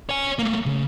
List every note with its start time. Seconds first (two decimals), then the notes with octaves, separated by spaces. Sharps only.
0.09 C#5 G#5
0.39 A3 A#3
0.66 C#3